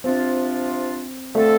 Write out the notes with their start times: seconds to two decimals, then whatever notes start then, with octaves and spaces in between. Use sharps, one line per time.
0.04 C3 F3 C4 D4 F4
1.34 D3 F3 A3 C4 A4